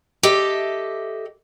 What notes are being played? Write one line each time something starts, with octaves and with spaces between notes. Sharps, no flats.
G4 A4 D#5 E5